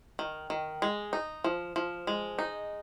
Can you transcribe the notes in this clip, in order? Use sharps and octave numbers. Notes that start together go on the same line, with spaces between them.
D#3
D#3
G#3
D#4
F3
F3
G#3
D#4